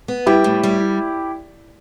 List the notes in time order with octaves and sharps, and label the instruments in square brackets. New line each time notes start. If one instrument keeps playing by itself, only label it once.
[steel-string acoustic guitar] B3
[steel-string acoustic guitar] G3 [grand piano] E4 G4
[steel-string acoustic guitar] A2
G3